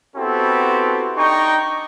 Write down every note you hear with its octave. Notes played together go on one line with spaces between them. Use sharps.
B3 C4 E4 F#4 G4 A4
D4 D#4 G5 A#5 C#6